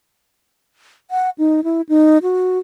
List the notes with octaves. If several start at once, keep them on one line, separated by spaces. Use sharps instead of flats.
F#5
D#4
E4
D#4
F#4